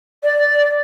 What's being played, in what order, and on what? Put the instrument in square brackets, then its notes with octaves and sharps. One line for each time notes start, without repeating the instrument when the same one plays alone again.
[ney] D5